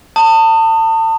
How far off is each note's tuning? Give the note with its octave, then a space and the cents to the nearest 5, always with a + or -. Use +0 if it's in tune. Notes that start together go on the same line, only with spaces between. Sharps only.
A5 +35 D#6 -10